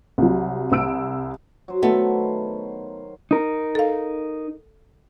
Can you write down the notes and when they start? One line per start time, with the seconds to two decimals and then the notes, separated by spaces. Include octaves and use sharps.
0.18 C2 C3 F#3
0.72 C2 E6 D7
1.68 F#3 C5
1.82 D#3 A3 B3 E4
3.31 D#4 A#4
3.75 A4 F5